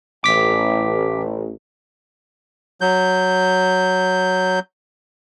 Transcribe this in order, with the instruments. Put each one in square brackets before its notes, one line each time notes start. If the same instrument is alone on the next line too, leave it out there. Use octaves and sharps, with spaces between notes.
[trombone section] A1 [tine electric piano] D6 B6
[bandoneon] F#3 G6